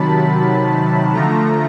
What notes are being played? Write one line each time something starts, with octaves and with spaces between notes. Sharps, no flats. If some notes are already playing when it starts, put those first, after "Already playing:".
Already playing: C3 D#3 F#3 A5 B5
D3 F3 A3 A#5